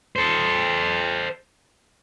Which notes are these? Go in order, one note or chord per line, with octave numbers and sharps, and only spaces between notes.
A4 C5